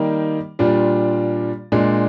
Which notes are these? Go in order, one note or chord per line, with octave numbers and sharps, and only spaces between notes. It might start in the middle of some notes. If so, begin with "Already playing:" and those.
Already playing: D#3 G3 A#3 D#4
A#2 G3 D4 F4
A#2 G#3 D4